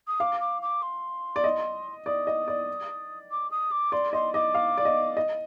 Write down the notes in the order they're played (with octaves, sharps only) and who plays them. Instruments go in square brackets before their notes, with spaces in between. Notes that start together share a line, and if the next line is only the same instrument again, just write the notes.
[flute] D#6
[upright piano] F5 [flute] D6
[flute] D6
D6
C6
[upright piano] D5
D#5
[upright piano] D5 [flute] D#6
[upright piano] D#5
D5
[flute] D6
D#6
D6
[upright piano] D5 [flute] C6
[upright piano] D#5 [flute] C6
[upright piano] D#5 [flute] D6
[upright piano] F5
D5
D#5
D#5